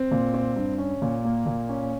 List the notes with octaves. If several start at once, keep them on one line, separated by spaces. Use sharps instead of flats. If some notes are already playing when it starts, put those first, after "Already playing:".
Already playing: C4
A#2
C4
G2
C#4
A#2
A#3
A#2
C#4